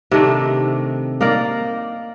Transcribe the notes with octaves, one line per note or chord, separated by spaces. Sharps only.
C3 D#3 A3 D4
A#3 D#4 A#4 D5